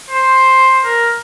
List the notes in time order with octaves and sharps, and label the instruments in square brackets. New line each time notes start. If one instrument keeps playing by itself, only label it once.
[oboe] C5
A#4